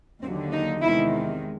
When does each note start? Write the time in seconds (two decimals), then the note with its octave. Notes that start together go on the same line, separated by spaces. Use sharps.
0.23 D#2 D3 F#3 C4
0.52 D#4
0.82 E2 C3 D#3 G#3 E4